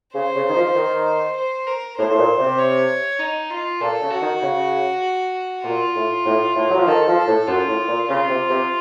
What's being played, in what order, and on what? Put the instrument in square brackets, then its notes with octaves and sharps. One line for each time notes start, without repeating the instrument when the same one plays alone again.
[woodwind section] C#3 [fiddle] C5
[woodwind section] C#3
D#3
F3
D#3
[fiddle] C5
A#4
[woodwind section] A2 [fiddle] C5
[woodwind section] A2
A#2
C3
[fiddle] C#5
D#4
F4
[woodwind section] A#2 [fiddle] A4
[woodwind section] C#3
[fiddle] F#4
[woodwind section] D#3
C#3
[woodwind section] A#2 [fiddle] F4
[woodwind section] A2
A2
A2
F#3
F3
[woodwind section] D#3 [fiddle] A4
[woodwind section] F3
[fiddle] A4
[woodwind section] A2
[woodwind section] F#2 [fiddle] F4
[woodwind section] A2
A#2
[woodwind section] C#3 [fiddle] F4
[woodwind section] C3
C3